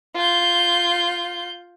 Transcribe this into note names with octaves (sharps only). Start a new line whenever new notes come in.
F4 G6